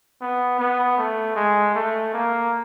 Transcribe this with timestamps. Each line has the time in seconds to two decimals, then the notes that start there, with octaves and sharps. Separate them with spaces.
0.21 B3
0.59 B3
0.98 A3
1.36 G#3
1.75 A3
2.14 A#3